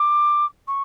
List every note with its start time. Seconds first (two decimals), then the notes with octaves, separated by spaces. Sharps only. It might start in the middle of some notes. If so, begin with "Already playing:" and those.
Already playing: D6
0.67 C#6